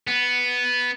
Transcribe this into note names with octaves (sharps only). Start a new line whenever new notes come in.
B3